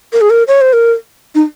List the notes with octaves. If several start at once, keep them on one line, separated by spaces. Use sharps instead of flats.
A#4
G#4
A#4
C#5
C5
A#4
D#4